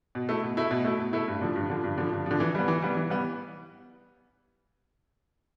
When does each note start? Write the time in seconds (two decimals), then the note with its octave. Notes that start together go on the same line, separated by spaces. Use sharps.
0.15 B2
0.29 A3 E4
0.43 B2
0.57 A3 E4
0.71 B2
0.85 A3 E4
1.00 B2
1.13 A3 E4
1.28 G2
1.41 D3 F3
1.56 G2
1.70 D3 F3
1.84 G2
1.98 D3 F3
2.12 G2
2.26 D3 F3
2.40 E3
2.55 G3 B3
2.68 E3
2.82 G3 B3
2.97 E3
3.10 G3 B3